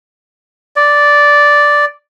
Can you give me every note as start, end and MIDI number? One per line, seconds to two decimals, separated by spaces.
0.76 1.85 74